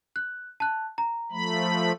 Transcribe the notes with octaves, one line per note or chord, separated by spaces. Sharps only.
F#6
A5 F#6
A#5
F3 A3 B5